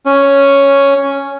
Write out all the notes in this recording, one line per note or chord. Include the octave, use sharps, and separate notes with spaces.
C#4